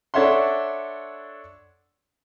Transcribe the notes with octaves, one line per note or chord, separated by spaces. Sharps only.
D4 A4 C#5 E5 F#5 C6